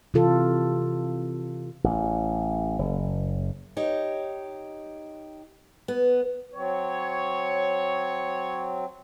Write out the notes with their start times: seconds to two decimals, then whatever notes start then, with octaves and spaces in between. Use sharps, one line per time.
0.14 C3 E3 F4 A4
1.84 A1
2.79 F#1
3.77 D#4 G4 C#5
5.88 B3
6.54 F#3 C4 C#5